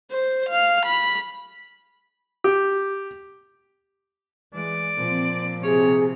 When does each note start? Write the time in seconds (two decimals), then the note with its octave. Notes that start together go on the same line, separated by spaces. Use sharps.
0.11 C5
0.50 F5
0.86 B5
2.44 G4
4.54 E3 G#3 D5
4.96 A#2 F3 C4
5.63 C3 G#4 C#5